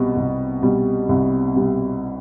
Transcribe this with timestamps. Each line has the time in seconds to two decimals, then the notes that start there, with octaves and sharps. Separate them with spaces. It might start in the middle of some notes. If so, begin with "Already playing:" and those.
Already playing: C2 B2 G3
0.16 C2
0.62 B2 G3
1.09 C2
1.56 B2 G3